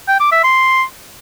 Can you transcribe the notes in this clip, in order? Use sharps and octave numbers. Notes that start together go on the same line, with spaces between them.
G5
D6
E5
C6